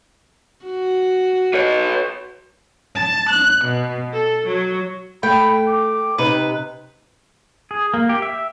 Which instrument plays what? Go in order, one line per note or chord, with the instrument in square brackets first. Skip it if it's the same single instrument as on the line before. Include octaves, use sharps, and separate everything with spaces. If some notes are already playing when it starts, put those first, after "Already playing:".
[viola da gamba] F#4
[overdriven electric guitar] B4 C#5
[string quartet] A5
F#6
B2
A4
F#3
[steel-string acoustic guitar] A3 [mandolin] G5 [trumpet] B5
[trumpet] D6
[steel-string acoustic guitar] C3 [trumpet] D#4 [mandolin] B4
[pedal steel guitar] G#4
A#3
G4
E5